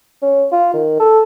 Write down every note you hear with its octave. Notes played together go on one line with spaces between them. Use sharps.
C#4
F4
D#3
A4